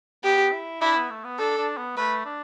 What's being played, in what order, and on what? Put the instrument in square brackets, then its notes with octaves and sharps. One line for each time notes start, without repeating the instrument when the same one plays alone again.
[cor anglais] B3 [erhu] G4
[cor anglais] E4
[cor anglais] D4 [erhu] E4
[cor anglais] B3
A3
B3
[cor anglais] D4 [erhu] A4
[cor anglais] D4
B3
[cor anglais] A3 [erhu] B4
[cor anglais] D4